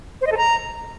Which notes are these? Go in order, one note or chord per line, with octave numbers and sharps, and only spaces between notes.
C5
D#5
A4
A#5